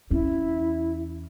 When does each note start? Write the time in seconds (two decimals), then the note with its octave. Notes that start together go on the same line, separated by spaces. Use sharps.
0.11 E2 C#4 E4